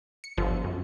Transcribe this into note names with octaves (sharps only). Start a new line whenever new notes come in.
C#7
G1 F3
F#2